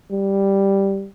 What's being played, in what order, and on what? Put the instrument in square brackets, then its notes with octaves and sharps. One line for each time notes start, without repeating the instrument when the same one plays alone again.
[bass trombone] G3